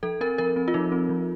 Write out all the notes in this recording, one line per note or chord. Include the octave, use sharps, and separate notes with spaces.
F3 A4
C4 A#4
F3 A#4
C4
F4
F3 D#4
C4
F3